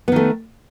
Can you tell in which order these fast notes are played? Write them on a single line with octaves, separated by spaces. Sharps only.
B3 D#3 A3